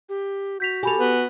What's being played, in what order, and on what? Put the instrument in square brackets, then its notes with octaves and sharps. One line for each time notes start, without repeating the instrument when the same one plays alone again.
[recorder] G4
[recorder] F#4 [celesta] G6 B6 F7
[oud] G4 A4 [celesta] G#5 B5 F7
[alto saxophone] B3 [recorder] F#4